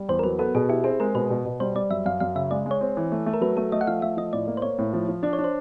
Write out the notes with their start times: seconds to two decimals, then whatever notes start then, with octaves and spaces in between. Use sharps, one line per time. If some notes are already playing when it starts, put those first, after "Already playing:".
Already playing: G3
0.09 E2 C5
0.19 A#4
0.24 F#3 B4
0.39 B3 A4
0.55 B2 G#4
0.69 E4 G4
0.84 C4 G#4
1.00 G#3 A#4
1.15 B2 B4
1.30 B2
1.45 B2
1.60 G3 C5
1.75 G3 D5
1.90 F#2 E5
2.06 F#2 F5
2.20 F#2 F5
2.35 C#3 E5
2.51 G#3 D5
2.66 G#3
2.71 C#5
2.81 C4
2.97 E3
3.12 A3
3.26 A3
3.34 A#4
3.41 F#3 B4
3.57 A3 A4
3.72 A3 D#5
3.81 F#5
3.87 F3 F5
4.02 A3 E5
4.17 F3 D#5
4.33 A2 D5
4.47 A#3
4.57 C5
4.62 A#3 C#5
4.79 A2
4.93 F3
5.08 F3
5.23 D4 D5
5.33 C#5
5.39 D4
5.44 C5